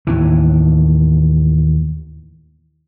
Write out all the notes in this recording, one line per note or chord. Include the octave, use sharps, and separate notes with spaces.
D#2 A2 E3